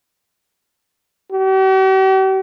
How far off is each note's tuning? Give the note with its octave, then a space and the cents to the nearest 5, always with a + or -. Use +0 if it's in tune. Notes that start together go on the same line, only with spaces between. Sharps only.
G4 -45